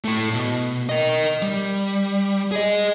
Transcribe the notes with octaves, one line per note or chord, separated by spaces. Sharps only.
A2 A3
B2
A#4 D#5
G3
G#4 D#5